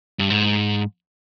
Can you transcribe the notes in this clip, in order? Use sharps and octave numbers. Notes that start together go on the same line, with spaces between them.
G2
G#2